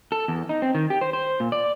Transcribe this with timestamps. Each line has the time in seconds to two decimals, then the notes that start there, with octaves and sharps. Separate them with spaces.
0.12 A4
0.28 E2
0.49 D#4
0.62 C4
0.75 D#3
0.90 G4
1.01 C5
1.13 C5
1.40 A#2
1.52 D5